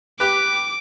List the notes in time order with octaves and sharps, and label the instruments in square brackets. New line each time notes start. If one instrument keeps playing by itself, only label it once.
[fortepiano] G4 B4 [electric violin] D6